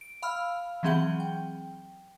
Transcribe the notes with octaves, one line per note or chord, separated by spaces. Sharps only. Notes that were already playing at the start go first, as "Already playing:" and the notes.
D7
F5 B5 E6 F6
E3 F#3 C4 G#4 F#5 G7
G5